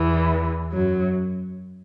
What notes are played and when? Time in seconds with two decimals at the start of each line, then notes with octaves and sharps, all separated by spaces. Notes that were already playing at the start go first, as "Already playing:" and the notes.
Already playing: E2 E3
0.73 F#2 F#3